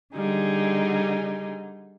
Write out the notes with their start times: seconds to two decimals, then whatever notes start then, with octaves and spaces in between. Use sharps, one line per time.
0.14 D3 G3 D#4 G#4